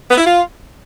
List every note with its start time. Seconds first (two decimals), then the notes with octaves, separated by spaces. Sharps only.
0.10 B3
0.18 E4
0.25 F4